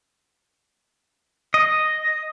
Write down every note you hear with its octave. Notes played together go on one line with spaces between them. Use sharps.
D#5